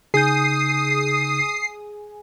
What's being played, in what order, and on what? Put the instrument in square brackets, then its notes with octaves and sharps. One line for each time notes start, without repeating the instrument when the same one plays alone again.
[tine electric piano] C#3 D#4 G6 [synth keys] G#4 [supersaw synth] D#6 [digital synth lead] C7